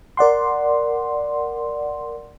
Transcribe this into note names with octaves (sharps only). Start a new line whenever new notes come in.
A#4 D5 F#5 C6